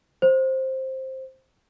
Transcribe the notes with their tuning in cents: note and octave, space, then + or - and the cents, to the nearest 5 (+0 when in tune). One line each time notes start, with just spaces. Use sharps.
C5 +10